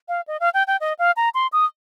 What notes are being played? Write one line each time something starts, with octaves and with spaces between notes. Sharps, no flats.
F5
D#5
F5
G5
G5
D#5
F5
A#5
C6
D#6